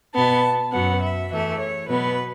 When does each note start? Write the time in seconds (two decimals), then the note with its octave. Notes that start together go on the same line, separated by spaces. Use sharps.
0.14 B2 B3 A5
0.72 F#2 F#3 B3 F#5
1.02 E5
1.31 E2 E3 A3 E5
1.59 C#5
1.88 B2 F#3 B3 B4